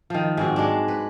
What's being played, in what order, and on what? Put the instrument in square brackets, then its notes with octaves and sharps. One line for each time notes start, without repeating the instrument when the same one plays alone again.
[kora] D#3 F3
G#2 C4 F#4
G#3 D4
B4